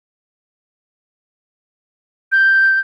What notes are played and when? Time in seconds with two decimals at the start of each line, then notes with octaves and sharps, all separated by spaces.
2.32 G6